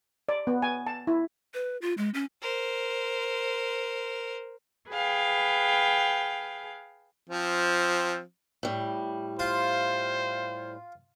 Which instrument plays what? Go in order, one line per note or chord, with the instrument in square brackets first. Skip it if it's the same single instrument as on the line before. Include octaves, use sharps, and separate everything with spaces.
[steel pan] D5
B3
G#5
A5
E4
[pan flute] B4
F4
G#3
C#4
[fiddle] A#4 C5
[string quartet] G#4 B4 F5 G5
[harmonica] F3 C4
[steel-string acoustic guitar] A2 G3
[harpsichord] F4 [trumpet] C5